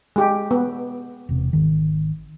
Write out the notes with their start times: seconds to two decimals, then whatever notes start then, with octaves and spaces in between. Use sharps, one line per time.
0.16 G#3 G4
0.51 B3
1.29 E1 C3
1.53 G#1 D#3